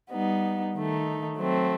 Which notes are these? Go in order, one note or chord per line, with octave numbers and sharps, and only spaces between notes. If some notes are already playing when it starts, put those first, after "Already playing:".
G3 B3 D#4
D#3 A3 D#4
F#3 A3 C4